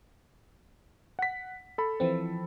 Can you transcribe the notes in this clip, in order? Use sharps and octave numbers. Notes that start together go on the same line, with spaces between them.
F#5 B6
A4 B5
E3 F3 C4